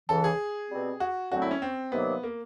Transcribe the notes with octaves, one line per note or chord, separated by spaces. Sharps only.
C#2 C#3 E3 A4
G#4
B2 G3 C4
F#4
F#2 D3 F#3 A3 C4 F#4
E4
C#4
C4
C3 D#3 F#3 A#3 B3
A#3